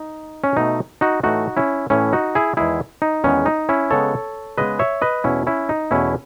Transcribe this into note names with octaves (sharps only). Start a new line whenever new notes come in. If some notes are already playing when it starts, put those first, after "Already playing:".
Already playing: D#4
C#4
B2 A3 D#4
D#4 F#4
A2 E3 A3 D#4 F#4
C#4 E4
A2 E3 A3 C#4 E4
D#4 F#4
E4 G#4
E2 D#3 G#3 B3 E4 G#4
D#4
E2 D#3 G#3 B3 C#4
D#4
C#4 E4
C#3 G#3 B3 A4 C#5
C#3 G#3 B3 B4 D#5
C#5 E5
B4 D#5
E2 B2 A3 C#4 E4
C#4 E4
D#4
E2 B2 A3 C#4 E4